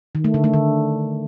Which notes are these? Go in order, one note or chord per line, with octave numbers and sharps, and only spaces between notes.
D#3
A3
D3
A3
D3